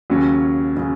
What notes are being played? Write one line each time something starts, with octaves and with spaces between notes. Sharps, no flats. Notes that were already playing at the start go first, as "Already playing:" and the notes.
D#2 C#3 F#3 C#4
C#3 F#3 C#4